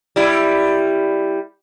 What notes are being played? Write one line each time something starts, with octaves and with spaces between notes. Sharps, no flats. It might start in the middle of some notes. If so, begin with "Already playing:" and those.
G3 E4